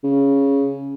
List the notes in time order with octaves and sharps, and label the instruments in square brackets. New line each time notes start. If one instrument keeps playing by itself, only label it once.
[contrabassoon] C#3